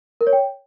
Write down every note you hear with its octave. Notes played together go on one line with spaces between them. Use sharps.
A#4
C#5
G5